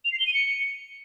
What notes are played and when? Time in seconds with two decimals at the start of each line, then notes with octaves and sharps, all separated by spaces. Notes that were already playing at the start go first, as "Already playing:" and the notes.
0.05 F7
0.12 C7
0.19 G7
0.27 D#7
0.34 C#7